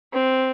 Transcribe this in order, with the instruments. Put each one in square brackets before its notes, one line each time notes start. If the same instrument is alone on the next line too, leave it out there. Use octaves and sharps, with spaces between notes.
[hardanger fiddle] C4